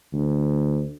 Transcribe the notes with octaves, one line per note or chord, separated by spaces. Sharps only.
D2